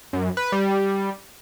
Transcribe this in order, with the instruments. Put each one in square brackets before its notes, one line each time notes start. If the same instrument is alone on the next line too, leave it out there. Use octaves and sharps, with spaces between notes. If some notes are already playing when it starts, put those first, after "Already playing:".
[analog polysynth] F#2
B4
G3